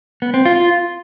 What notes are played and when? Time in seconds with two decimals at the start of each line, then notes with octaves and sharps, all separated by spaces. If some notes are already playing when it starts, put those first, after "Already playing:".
0.22 B3
0.34 C4
0.45 F4